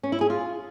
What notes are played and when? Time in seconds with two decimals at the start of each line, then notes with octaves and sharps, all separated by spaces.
0.03 C#4
0.12 E4
0.21 G#4
0.30 F4